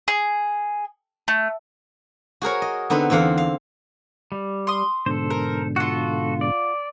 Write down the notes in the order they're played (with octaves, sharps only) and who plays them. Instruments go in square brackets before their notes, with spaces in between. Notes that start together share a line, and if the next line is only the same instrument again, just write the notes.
[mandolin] G#4
A3
[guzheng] F#4 G#4 A#4 C#5
D#5
D3 B3 C4 D#4 B4
E2 D3 C4 F5 F#5
F5
[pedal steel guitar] G3
[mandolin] C6 D#6
[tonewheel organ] G#2 B2 D3 [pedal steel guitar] A4 C5
[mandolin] A#4
[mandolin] F4 F#5 [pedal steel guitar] F#4 A4
[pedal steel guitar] D5